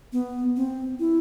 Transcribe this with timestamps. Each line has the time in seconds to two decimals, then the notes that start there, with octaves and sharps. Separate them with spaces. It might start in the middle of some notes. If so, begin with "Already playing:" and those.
0.13 B3
0.57 C4
1.00 E4